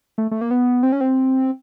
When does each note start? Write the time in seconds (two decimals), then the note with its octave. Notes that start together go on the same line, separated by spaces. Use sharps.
0.18 A3
0.31 A3
0.41 A#3
0.51 B3
0.83 C4
0.92 C#4
1.01 C4